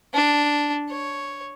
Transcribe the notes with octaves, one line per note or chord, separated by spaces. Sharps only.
D4
C#5